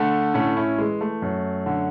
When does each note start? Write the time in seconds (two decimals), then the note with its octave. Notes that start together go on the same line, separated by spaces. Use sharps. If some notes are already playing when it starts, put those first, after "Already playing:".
Already playing: D3 A3
0.34 A2 A3 C#4
0.56 C#4 E4
0.78 E3 G#3
1.01 A3
1.22 F#2
1.66 D3